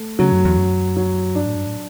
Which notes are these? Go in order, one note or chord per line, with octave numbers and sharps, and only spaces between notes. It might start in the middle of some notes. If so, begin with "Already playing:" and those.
Already playing: A3
C#3 F#3
F#2
E2
F#2
F#3
G2 D4
A2
G2
A2